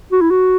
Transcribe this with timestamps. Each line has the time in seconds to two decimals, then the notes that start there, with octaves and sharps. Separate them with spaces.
0.12 F#4
0.21 E4
0.31 F#4